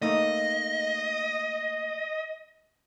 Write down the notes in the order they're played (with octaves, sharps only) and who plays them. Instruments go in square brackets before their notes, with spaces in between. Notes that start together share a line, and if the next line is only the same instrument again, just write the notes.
[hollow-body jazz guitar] A3 A#3 D#4 [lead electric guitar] D#5